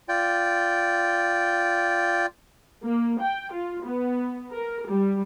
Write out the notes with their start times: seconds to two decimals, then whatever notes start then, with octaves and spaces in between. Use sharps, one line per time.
0.09 F4 D5 G5
2.85 A#3
3.20 G5
3.52 F4
3.85 B3
4.53 A#4
4.89 G3